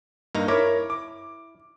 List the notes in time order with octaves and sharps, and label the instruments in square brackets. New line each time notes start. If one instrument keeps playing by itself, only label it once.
[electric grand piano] G2 [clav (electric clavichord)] A#3 D#4 A#5
[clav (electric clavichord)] E4 [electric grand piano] A#4 C#5 D6
[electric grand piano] D6